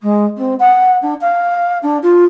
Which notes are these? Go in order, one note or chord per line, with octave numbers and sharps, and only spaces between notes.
G#3
C4
F#5
D4
F5
D4
F4